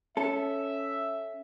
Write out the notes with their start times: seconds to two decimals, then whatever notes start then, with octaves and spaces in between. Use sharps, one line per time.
0.17 C#4 A4 E5